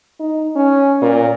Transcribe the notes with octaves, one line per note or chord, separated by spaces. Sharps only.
D#4
C#4
A#2